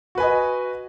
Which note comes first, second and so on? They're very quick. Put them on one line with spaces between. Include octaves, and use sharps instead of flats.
F#4 B4 G#5 D#5